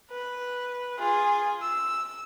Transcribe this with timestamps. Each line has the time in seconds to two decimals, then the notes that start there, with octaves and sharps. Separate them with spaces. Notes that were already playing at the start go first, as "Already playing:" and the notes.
0.11 B4
0.99 F4 G#4
1.62 E6